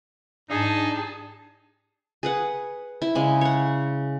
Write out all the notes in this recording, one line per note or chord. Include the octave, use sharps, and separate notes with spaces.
G#2 D4 D#4 G#4 A5
G#4 B4 F#5
E4
C#3 G#3 B5
C#5 F#5